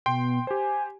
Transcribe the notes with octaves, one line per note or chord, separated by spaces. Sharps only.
B2 G5 C6
G4 C5 G#5